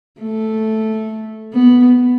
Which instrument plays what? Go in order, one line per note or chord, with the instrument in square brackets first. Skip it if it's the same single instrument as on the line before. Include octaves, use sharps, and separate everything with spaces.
[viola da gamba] A3
B3